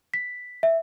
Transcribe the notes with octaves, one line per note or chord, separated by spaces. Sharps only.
B6
E5